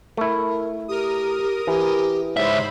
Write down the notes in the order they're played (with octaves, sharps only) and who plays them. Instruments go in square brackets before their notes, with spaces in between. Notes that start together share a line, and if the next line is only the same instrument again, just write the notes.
[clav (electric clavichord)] A3 E4 [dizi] A#4
[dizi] G4 [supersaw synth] A#4 D#6
[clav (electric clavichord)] E3 [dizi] G4
[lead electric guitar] C#2 E5 [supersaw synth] G#2 C5 B5 [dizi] C#5